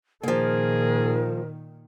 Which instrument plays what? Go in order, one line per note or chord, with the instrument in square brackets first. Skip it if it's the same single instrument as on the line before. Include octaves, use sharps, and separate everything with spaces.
[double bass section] A#2 D#3 [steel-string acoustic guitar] F3 A#3 [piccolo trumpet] G#4 [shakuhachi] A#4